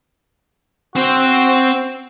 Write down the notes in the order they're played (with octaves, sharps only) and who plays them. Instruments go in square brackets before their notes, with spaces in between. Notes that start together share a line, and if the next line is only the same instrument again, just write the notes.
[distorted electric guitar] C4 C5 [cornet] F#4